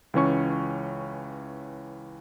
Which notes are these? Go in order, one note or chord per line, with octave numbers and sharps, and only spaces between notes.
C#2 E3 C#4 C#6